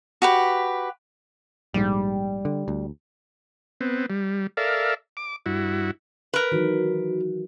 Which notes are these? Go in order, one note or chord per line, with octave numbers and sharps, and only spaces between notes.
F#4 G4 B4
A#1 G#2 G3
D3
D2
B3 C4
G3
A4 A#4 D5 E5 F5
D6
G2 E4 F#4
A#4 B4
D#3 E3 F#3 F#4